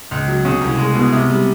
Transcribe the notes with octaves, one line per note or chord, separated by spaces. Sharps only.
C#2
F#3
C#3
C2
G#3
B2
C3
G3